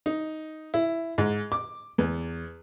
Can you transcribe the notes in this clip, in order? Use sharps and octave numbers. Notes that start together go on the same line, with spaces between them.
D#4
E4
G#2
D6
E2